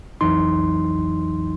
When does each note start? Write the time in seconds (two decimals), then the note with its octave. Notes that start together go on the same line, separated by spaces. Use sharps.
0.21 B1 F2 E3 F#3 D#4 C6